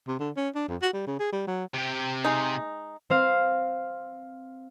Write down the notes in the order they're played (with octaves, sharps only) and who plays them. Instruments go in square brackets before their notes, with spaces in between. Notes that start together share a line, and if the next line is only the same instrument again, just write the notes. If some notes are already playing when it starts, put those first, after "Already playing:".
[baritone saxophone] C3
D3
C#4
D4
F2
F#4
G3
C#3
G#4
G3
F#3
[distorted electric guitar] C3 G4
[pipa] G#3 D#4
[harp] C4 C5 F5